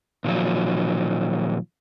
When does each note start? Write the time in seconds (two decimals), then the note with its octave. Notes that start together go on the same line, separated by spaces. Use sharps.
0.25 A#2 D#3 F3 F#3